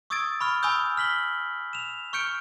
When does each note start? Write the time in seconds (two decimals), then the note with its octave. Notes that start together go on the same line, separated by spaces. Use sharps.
0.10 C#6 D#6 E6 G#6 A6 D7
0.40 B5 C#6 F6
0.63 G#5 B5 C#6 D#6 E6 G6
0.97 F6 B6 F#7 G7
1.73 E7 F7
2.13 C#6 F6 G6 C#7 D7